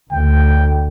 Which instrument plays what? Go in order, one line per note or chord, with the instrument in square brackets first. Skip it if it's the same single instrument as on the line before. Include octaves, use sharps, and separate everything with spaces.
[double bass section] D2 [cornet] G5